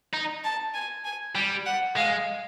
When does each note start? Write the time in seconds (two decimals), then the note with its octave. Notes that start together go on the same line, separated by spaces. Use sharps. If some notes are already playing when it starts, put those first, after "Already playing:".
0.13 D#4
0.44 A5
0.74 G#5
1.05 G#5
1.35 G3 G5
1.66 F#5
1.96 G#3 F5